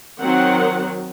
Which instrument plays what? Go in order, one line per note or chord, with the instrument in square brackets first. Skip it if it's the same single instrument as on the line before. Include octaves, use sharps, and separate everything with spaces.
[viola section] D#3 F#3 C4 F#5